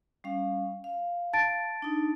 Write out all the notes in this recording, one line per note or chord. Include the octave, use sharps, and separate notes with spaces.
G3 C#4 F5
F5
A5 A6 D7
D4 D#4